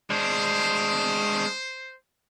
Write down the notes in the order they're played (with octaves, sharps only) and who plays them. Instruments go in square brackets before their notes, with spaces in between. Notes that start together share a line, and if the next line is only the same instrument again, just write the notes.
[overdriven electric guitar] G#3 D4 [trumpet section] C5